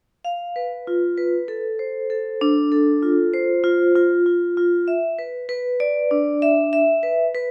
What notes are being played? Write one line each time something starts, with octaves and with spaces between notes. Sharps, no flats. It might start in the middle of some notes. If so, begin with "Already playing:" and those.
F5
B4
F4
B4
A4
C5
A4
D4
A4
F4
C5
F4
F4
F4
F4
E5
B4
B4
D5
D4
E5
E5
B4
B4